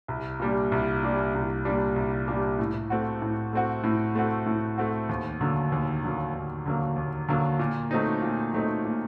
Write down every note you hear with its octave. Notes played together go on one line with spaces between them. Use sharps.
C2
A#2 G3 D4
C2
A#2 G3 D4
C2
A#2 G3 D4
C2
A#2 G3 D4
A2
A3 C4 F#4
A2
A3 C4 F#4
A2
A3 C4 F#4
A2
A3 C4 F#4
D#2
D3 F#3 A#3
D#2
D3 F#3 A#3
D#2
D3 F#3 A#3
D#2
D3 F#3 A#3
A#2
F#3 A3 C4 D#4
A#2
F#3 A3 C4 D#4
A#2